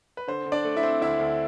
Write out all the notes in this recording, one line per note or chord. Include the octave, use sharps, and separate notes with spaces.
B4
D3 C5
D3
D4 D5
A3
E4 E5
C4
D2 E4 E5
D2